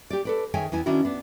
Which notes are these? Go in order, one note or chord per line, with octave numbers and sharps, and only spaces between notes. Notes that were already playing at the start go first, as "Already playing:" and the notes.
G4 D5
A4 B4 D5
D#3 G#4 C#5 E5 G5 G#5
E2 B3 E4 G#5
D#3 C#4 D4 E4 F#4
B3 D4